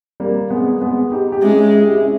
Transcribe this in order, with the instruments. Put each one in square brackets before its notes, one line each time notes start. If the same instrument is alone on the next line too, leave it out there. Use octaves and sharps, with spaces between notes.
[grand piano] G3 A#3
G#3 B3
G#3 B3
D#4 G4
G4
[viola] G#3 [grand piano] C#4 E4
[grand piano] E4
G4
C#4 E4